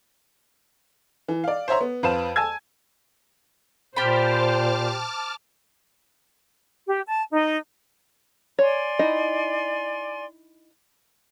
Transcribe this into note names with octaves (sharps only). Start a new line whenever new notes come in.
E3
D5 F5
C5 C#5 E5 A#5 C6
B3
F2 B4 C5 F5 A5 E7
G#5 A5 E6 G#6
A#2 G4 C5 A5 B5 D6 F6
G4
A5
D#4
C#5 D5 G#5 C6
D#4 E4 D#5